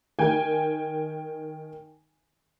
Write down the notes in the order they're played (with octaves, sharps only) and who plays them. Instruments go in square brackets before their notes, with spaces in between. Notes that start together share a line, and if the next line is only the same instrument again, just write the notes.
[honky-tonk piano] D#3 G5 G#5